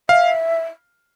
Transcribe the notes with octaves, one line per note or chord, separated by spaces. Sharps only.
E5 F5